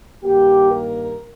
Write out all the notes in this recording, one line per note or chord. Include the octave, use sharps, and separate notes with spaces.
G2 D#3 A#3 G4
A#4